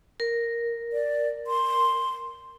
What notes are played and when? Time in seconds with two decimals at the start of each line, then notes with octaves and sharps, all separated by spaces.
0.20 A#4
0.93 D5
1.47 C6